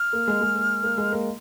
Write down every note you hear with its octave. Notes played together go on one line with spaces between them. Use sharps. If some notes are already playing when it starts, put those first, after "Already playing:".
Already playing: F6
A#3
G#3
G#3
A#3
A#3
G#3
A#3